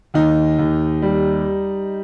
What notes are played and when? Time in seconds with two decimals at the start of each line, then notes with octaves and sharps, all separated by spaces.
0.14 D#2 D#4
0.59 D#2
1.02 G3